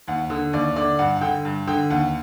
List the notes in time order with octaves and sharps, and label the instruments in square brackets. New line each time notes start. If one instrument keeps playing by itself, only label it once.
[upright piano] D#2 F#5
D3
D#2 D5
D3 D5
G2 F#5
F#5
D3 G5
G2
D3 G5
D#2 F#5